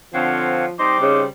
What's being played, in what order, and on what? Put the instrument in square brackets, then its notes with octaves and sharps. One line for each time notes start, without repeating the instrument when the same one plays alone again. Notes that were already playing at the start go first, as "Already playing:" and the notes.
[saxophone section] D3 C4 [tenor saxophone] F3 [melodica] C#5 F5 F#5
[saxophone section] G3 C4 C5 [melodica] D#4 D#5 C6 [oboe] D6
[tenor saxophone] C#3 [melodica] D#4